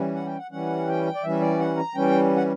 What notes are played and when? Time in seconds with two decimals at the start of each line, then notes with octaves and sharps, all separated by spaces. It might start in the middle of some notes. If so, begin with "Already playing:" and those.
Already playing: E3 G3 C#4
0.15 F#5
0.26 G5
0.38 F#5
0.51 E3 G3 C#4 F#5
0.88 G5
1.15 D5
1.23 E3 G3 C#4 E5
1.41 D5
1.59 F#5
1.77 A#5
1.95 E3 G3 C#4 G5
2.36 F#5